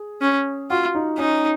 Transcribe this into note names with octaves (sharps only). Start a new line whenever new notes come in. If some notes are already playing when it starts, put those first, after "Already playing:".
Already playing: G#4
C#4
F4 F#4
D#4
C#4 D#4